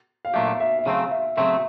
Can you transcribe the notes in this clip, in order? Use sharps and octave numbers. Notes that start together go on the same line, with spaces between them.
F5
A#2 F#3 A3 D4 G4 E5
E5
E5
E5
C#3 F#3 A3 C4 F5
E5
C#3 F#3 A3 C4 E5